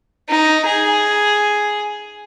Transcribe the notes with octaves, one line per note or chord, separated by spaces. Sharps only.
D#4
G#4